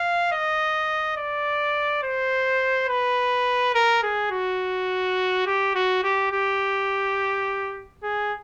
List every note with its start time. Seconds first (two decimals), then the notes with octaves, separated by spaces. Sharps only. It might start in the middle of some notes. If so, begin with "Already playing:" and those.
Already playing: F5
0.32 D#5
1.17 D5
2.03 C5
2.88 B4
3.75 A#4
4.03 G#4
4.31 F#4
5.46 G4
5.75 F#4
6.04 G4
6.32 G4
8.03 G#4